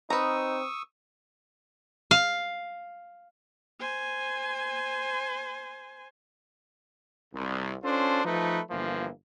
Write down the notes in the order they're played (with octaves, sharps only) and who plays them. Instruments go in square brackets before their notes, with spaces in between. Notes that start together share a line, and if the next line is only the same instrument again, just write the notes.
[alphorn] C4 [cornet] D#4 [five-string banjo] B4 A#5 [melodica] C#6 D#6 E6
[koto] F5
[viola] C5 G#5
[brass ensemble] C2
C#4 D4 F4 A4 C5
F3 A3 D#4 B4
G1 E3 F3 A#3